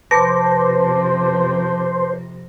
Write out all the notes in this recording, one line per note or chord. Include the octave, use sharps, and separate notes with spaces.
F2 C3 B4 C5 A5 D6 A#6